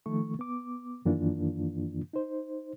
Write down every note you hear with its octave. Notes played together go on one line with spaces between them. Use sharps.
D#3 F3 A3 C#6
B3 D6
F#2 D#3 E3 A#3 D4 F4
D#4 C5